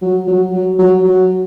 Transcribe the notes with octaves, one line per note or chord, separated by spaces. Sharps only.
F#3
F#3
F#3
F#3
F#3